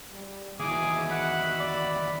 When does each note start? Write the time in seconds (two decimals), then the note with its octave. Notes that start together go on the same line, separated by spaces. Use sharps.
0.11 G3
0.59 D#2 E3 F#4 G#4 D#5 E5 D6
1.11 F#5 B5
1.60 D5